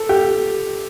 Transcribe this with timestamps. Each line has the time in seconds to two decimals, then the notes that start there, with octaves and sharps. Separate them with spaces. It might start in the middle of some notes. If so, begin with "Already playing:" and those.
Already playing: A4
0.09 G4